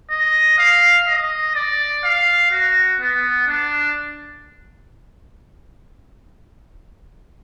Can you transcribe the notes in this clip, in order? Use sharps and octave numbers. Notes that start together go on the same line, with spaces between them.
D#5
F5
D#5
D5
F5
F#4
B3
D4